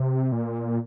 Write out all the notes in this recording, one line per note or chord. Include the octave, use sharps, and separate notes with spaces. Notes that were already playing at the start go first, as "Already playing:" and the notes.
Already playing: C3
A#2